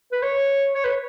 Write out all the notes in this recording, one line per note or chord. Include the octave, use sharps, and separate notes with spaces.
B4
C#5
C#5
B4